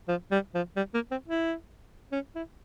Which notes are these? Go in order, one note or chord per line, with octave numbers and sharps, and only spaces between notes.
F3
G3
F3
G3
A#3
C4
E4
C#4
E4